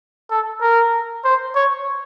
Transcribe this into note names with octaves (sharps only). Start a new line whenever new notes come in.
A4
A#4
C5
C#5